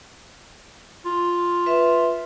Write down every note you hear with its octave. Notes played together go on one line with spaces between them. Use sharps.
F4
B4 E5